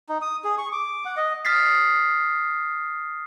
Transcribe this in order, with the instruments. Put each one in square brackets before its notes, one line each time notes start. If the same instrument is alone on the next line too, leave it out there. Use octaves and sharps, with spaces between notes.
[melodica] D#4
D#6
G#4
C#6
D6
F#5
D#5
[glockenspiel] D#6 F6 A6 B6 C7